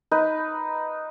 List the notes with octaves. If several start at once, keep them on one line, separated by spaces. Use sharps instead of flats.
D#4 B4